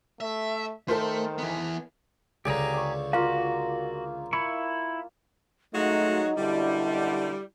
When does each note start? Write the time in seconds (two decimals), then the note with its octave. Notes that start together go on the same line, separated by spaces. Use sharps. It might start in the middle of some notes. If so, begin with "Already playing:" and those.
0.20 A3 E5
0.88 D#3 A3 A4 A#4 C5
1.38 E3 B3
2.45 C#2 D3 G4 G#4 A#5
2.73 D5 C#6
3.13 A#3 F4 F#4 F5
4.33 E4 B5 C#6
5.74 F#3 G#3 A3 D#4 F4 F#4 D#5
6.37 F#2 B2 D3 G3 E4